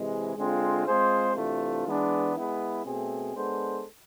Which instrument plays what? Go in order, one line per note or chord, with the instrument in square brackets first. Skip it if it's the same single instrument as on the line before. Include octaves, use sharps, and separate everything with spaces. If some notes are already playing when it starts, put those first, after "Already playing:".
Already playing: [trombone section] C3 E3 G#3
D3 G#3 C4 F4
G#3 C4 F4 G#4 C5
C3 E3 A3 D4 F4
E3 G#3 B3 D4
G#3 B3 E4
B2 A3 C4 G#4
G#3 B3 D4 A4 C5